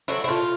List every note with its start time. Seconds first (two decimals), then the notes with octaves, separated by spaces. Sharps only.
0.08 F#3 A3 C4 E4
0.24 E4
0.28 A2 F4